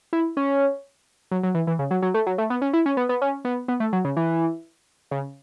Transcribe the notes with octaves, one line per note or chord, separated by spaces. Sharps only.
E4
C#4
F#3
F#3
E3
E3
C#3
F#3
F#3
A3
F#3
A3
B3
C#4
E4
C#4
B3
B3
C#4
B3
B3
A3
F#3
C#3
E3
C#3